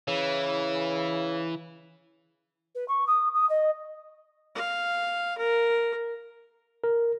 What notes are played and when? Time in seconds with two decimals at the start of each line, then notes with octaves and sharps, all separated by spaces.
0.08 C#3 E3
2.75 B4
2.88 C#6
3.07 D#6
3.34 D#6
3.49 D#5
4.55 F5
5.37 A#4
6.84 A#4